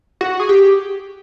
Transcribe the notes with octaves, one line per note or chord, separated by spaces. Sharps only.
F#4
G#4
G4